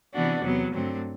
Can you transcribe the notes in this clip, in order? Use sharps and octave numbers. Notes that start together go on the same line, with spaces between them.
C3 E3 B3 D4 F#4
E2 C3 F#3 B3
G2 D3 F#3 A3 C4